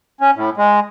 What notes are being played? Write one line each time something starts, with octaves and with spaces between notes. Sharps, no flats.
C#4
A2
G#3